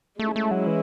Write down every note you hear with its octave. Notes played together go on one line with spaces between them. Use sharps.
G#3 A3 C#4 E4
A3
F#3
E3